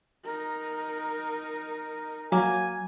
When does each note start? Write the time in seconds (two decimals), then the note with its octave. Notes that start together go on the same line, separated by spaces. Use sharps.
0.24 D#4 A#4
2.32 F#3 A#3 G#5